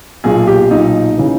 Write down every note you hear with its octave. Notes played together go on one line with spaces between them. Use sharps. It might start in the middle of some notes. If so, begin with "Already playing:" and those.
B1 A#2 G#4
G4
B1 A#2 D#4
C#3 E3